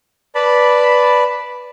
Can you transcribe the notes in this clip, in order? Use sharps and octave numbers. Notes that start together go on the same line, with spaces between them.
B4 D5 A5 B5